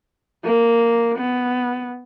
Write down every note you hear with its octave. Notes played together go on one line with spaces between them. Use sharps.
A#3
B3